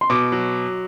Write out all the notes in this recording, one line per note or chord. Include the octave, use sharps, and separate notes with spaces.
C6
B2 D6
F#3